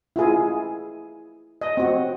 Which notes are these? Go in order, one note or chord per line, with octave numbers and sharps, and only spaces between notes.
E4 F4 G#4
D#5
C4 F#4